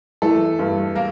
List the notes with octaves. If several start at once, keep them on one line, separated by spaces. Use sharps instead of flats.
E3 A3 A4
G2
A#3 A#4